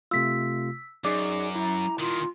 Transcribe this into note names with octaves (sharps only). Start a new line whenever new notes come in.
C3 A3 F4 E6 B6
F#2 D#4 G#4 D5 D6
E4 A#5
A#2 D#3 F4